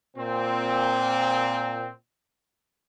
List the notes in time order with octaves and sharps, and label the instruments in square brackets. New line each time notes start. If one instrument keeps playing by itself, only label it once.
[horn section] A#2 C4